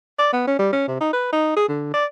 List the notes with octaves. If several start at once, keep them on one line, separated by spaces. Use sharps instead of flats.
D5
B3
C#4
G3
C#4
C3
D#4
B4
D#4
G#4
D3
D5